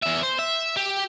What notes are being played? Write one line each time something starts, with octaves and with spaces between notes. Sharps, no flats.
E2 E5
C5
E5
G4